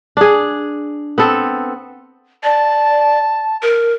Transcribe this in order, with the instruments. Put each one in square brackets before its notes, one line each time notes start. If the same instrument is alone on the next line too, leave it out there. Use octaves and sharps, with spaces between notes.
[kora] D4 G#4
B3 C4 A4
[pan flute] D5 [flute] A5
[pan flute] A#4